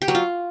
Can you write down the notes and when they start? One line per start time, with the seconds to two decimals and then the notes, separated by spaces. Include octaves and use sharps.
0.02 G4
0.08 F#3
0.15 F4